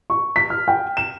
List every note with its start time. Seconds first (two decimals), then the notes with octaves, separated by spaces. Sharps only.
0.10 C#6
0.36 B6
0.50 F6
0.68 G5
0.97 E7